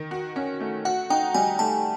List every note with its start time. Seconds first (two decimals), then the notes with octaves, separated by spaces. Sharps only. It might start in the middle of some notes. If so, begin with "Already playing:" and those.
Already playing: D#3
0.11 F#4
0.36 C#4
0.60 A3
0.85 F#4 F#5
1.10 D#4 G5
1.34 G3 G#5
1.59 A3 A5